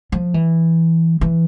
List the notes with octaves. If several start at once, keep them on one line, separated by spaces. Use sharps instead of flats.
F3
E3
E3